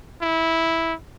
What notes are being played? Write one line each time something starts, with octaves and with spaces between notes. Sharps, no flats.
E4